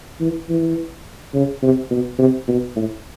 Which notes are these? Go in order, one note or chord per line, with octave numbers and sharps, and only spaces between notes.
E3
E3
C#3
C3
B2
C3
B2
A2